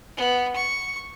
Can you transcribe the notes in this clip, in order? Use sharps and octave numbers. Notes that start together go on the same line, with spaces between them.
B3
C#6